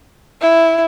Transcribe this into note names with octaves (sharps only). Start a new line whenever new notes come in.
E4